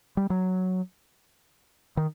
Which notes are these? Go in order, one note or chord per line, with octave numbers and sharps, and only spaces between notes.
G3
F#3
D#3